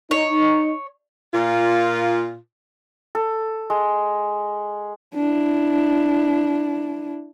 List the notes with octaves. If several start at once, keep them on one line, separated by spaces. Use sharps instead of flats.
D#4 C#5
A#2 F4
A4
G#3
D4 E4